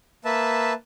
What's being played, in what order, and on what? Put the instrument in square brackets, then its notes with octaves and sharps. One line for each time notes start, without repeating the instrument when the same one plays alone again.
[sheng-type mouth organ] A#3 B4 E5 A5